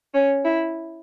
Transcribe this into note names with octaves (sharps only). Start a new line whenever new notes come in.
C#4
E4